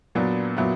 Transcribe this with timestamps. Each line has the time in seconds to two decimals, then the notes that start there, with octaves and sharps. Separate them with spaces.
0.15 A#2 F#3 B3 D4
0.57 A#2 F#3 B3 E4